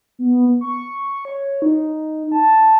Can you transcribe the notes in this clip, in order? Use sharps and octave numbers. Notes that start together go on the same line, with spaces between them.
B3
C#6
C#5
D#4
A5